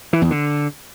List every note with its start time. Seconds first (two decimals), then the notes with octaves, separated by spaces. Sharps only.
0.13 E3
0.22 E2
0.31 D3